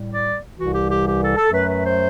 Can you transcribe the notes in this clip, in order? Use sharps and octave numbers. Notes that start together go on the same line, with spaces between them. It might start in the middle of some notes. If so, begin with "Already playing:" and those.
Already playing: A2 G3
D5
C2 C3 E3 G3 F#4
G4
G4
G4
A4
A4
F#2 F#3 A3 B4
B4
C5